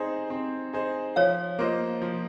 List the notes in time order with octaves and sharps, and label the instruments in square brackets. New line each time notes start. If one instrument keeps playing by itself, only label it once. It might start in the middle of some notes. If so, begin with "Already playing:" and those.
Already playing: [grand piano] C4 D#4 G#4 C5
C4
D#4 G#4 C5
[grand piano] F3 [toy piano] C#5 F5
[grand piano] A#3 F4 C5 D#5
F3